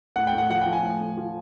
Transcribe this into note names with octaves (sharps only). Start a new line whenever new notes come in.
A2 F#5
G5
A2
F#5
F3 F#5
F3 G5
G#5
A2
A2
F3